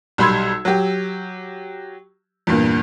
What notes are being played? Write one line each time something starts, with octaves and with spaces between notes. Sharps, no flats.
B1 G3 B5 C6 E6 G#6
F#3 G4
E2 G2 A#2